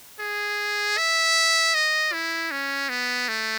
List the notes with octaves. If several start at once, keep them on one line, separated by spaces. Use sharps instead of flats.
G#4
E5
D#5
E4
C#4
B3
A3